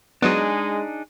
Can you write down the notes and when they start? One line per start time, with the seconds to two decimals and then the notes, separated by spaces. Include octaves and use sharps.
0.22 F#3 G#3 B3 D4 D#4 G#4